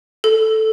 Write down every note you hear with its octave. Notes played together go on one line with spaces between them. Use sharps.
A4